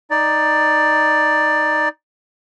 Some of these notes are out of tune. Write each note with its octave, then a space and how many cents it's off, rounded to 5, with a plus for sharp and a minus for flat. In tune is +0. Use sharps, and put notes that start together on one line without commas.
D#4 +0 D5 +10